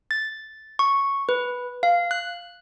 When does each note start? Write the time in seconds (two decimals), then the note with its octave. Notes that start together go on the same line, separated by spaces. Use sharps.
0.11 A6
0.79 C#6
1.29 B4
1.83 F5
2.11 F#6